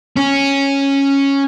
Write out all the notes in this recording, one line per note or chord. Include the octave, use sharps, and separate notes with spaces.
C#4